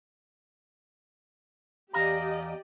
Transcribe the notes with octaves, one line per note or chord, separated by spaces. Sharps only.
E2 G4 D5 D#5 F5 A#5